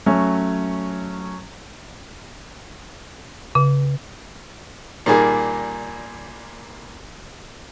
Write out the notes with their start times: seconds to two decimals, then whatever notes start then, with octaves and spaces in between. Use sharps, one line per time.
0.06 F#3 A3 C#4
3.55 C#3
5.06 A#2 D#3 G3 A#3 G#4